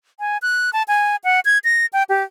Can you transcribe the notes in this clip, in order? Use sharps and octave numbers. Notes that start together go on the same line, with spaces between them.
G#5
F#6
A5
G#5
F#5
G#6
A#6
G5
G4